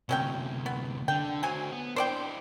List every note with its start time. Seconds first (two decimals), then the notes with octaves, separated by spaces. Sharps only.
0.09 D2 C3 F#3 C#4 G5
0.66 B3
1.08 D3 G5
1.43 F#3 F#4 C5 G#5
1.72 B3
1.96 D4 E4 C5 D5 G5